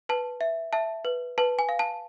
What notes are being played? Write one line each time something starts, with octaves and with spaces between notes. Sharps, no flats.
B4 A5
E5
E5 A5
B4
B4 A5
G#5
F5
A5